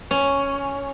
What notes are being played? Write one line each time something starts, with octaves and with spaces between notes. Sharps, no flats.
C#4